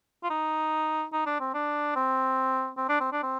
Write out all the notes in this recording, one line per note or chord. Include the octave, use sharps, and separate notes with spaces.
F4
D#4
D#4
D4
C4
D4
C4
C4
D4
C4
D4
C4